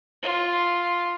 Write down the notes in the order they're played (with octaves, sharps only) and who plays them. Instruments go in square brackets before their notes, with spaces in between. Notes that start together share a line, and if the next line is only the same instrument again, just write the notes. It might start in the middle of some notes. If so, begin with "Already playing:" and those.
[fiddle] F4